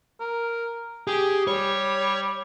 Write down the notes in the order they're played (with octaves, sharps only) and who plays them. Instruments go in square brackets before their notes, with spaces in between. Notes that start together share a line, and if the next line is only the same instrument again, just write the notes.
[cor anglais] A#4
[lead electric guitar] G4 [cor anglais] G#4
[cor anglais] G3 [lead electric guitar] C#5